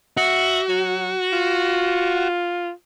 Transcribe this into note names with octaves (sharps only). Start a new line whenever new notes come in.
F#4 E5
F#3
F4